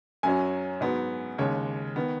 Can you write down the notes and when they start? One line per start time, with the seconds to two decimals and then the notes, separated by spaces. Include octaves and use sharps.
0.23 F#2 F#3 C#4 G#5
0.81 G#2 F#3 B3
1.38 D#2 C#3 G#3 C#5
1.96 D#3 B3